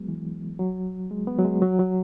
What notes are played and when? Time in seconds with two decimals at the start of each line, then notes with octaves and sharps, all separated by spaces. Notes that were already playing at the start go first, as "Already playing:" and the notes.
Already playing: F#3 G#3 B3
0.08 E3
0.59 F#3
1.11 G#3
1.27 B3
1.39 F#3
1.45 G#3
1.62 F#3
1.79 F#3